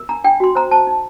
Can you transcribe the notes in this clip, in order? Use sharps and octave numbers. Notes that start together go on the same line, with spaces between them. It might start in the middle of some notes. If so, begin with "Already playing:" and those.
Already playing: A#4
D4 A#5
D4 G5
F#4 C6
C5 A#5
C5 A5
D#4